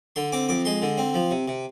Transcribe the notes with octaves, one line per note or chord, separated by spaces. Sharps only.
D3 C6
C4 D6
F2 D6
G#3 C6
D3
C4
F3
C3
C3